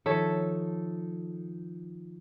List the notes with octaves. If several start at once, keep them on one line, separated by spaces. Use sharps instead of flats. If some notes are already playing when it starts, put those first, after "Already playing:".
D#3 F3 D#4 A4 C#5 E5